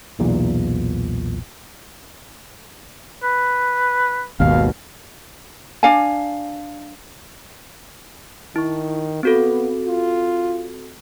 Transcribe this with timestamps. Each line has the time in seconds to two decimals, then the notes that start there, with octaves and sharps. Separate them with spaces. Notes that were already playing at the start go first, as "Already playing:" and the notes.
0.19 B1 E2 A#2
3.24 B4
4.40 G#1 D#2 B2 F5
5.83 D4 F5 G#5
8.56 D#3 E4 C#6
9.23 B3 C4 F#4 A4
9.88 F4